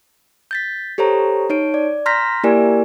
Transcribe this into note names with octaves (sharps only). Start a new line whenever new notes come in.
G6 A6 B6
G4 A4 C5 C#5 A#5
D#4 C#5 D7
D5
A#5 C6 F6 G6 A#6 B6
A#3 E4 G4 A#4 D5 G#5